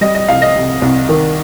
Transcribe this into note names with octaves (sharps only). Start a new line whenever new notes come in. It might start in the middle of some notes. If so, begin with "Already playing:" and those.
G3 D#5
D#5
C2 F5
D#5
C3
C2
D#3